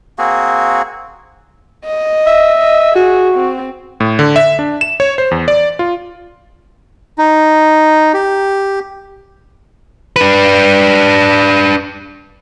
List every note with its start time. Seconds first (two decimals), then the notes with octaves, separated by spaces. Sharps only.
0.18 A#3 C4 F#4 G#4
1.85 D#5
2.26 E5
2.58 D#5
2.95 F#4 G#4
3.34 C4
4.00 A2
4.19 D3
4.36 E5
4.59 D4
4.81 E7
5.00 C#5
5.18 C5
5.31 E2
5.48 D5
5.79 F4
7.18 D#4
8.14 G4
10.16 D4 B4